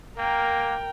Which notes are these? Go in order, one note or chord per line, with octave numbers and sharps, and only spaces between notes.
A#3 A#4 G5